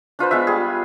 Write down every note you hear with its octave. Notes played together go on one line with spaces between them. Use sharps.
D4 F4 B4 C5
G#3 B3 F4 E5
G3 G#4